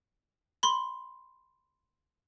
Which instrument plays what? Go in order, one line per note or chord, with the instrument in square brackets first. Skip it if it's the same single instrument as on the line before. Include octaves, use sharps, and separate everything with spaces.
[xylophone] B5 C6